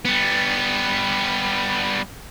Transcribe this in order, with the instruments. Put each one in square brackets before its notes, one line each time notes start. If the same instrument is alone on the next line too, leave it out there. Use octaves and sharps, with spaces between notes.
[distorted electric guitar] G3 B3